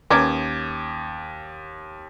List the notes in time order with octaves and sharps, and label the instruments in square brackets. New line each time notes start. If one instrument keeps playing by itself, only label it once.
[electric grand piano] D#2 D6 G#6 [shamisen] C#4 A#4 B4